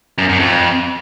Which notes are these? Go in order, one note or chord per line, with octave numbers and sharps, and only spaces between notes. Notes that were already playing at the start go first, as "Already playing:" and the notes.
F#2
F#2
F2